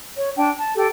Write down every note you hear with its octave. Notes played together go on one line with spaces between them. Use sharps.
C#5
D4 G5
A5
G4 A4 G5